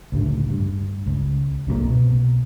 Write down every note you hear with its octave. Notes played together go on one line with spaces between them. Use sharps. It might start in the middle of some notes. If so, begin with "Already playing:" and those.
C#2 A2 D3
G2
C#2
C2 C3 F#3 A#3
B2